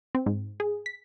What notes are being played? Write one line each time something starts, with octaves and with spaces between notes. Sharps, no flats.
C4
G#2
G#4
B6